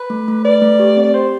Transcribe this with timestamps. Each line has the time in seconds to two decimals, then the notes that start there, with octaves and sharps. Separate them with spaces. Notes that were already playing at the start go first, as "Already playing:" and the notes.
Already playing: B4
0.10 A3
0.28 A3
0.44 B4 D5
0.62 A3
0.80 G4
0.97 C4
1.03 D5
1.14 G4 C5